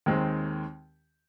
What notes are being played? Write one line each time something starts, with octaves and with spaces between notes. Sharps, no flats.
D#2 D#3 G#3 C4